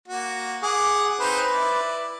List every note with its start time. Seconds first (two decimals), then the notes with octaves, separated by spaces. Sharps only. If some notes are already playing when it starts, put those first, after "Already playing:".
0.08 A#3 F#4
0.62 G#4 F#5 D6
1.20 C4 D#4 B4 C5
1.52 E4 D5